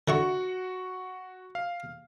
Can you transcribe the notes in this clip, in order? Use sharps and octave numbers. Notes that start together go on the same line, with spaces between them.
D3 E4 F#4 F#5 C#6
F5